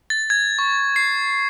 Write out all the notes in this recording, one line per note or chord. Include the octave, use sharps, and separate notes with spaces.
A6
G#6
C#6
C7